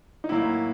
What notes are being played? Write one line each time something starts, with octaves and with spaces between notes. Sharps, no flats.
D#4
A2 F#3 A#3 E4